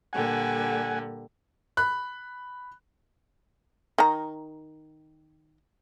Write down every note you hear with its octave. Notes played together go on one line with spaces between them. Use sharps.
A#2 D3 G3 F#5 G#5
B5 F#6
D#3 A#5